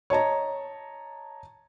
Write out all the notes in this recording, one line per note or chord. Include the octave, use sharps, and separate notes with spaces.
C#5 D#5 A5 A#5